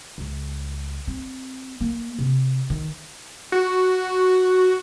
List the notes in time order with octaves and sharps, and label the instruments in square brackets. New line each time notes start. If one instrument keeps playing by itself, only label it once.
[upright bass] C#2
C4
A#3
C3
D#3
[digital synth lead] F#4